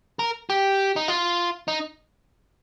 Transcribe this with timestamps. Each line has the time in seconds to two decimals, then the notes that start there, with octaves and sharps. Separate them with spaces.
0.19 A#4
0.50 G4
0.96 D#4
1.08 F4
1.68 D#4